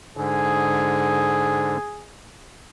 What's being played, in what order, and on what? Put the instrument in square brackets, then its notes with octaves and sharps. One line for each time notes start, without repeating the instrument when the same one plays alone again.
[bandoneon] G#2 D3 [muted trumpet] G#4